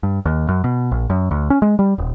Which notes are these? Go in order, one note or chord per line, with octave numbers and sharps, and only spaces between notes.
G2
D#2
F#2
B2
A#1
F#2
D2
C#4
G#3
G3
D#1